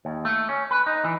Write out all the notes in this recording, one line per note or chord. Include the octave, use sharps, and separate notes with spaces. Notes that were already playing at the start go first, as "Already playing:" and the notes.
D#2
A3
C#4
B4
D#4
E3